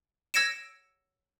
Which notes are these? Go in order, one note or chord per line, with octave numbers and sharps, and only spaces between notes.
E6 G#6 A#6 C#7 D7 E7